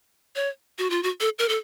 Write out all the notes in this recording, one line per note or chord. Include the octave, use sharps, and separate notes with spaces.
C#5
F#4
F4
F#4
A4
A#4
A4